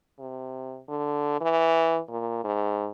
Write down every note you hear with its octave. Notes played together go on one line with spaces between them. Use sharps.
C3
D3
E3
A#2
G#2